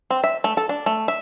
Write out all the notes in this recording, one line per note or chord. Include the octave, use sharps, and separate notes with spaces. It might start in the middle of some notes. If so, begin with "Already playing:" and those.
C4
E5
A3
A4
D4
A3
E5